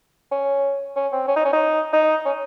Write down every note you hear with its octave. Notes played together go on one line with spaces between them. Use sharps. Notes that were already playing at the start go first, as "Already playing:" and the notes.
C#4
C#4
C4
C#4
D#4
C#4
D#4
D#4
C#4